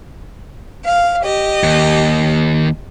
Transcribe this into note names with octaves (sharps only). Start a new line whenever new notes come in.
F5
G4 D#5
D#2